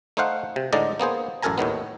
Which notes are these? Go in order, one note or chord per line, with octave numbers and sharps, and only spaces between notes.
A3 D#4 C5 F5 F#5
C3
A2 D3 G#3 D#4 D5 D#5
A#3 B3 G#4 C5
A1 F#2 A4 A#4 G#5 A#5
D#2 A2 D#3 B3